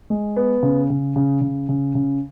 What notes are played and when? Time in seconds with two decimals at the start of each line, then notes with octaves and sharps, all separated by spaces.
0.10 G#3
0.36 B3
0.63 C#3
0.90 C#3
1.16 C#3
1.41 C#3
1.69 C#3
1.95 C#3